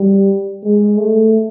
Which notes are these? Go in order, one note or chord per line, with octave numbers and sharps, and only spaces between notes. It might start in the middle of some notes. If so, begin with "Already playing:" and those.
Already playing: G3
G#3
A3